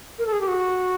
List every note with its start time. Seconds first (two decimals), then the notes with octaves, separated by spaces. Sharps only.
0.19 A#4
0.27 A4
0.32 G#4
0.41 G4
0.48 F#4